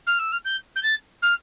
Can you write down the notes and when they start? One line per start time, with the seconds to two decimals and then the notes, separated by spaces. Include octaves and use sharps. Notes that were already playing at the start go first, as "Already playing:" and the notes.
0.06 F6
0.19 E6
0.32 F6
0.45 G6
0.75 G6
0.82 A6
1.22 F6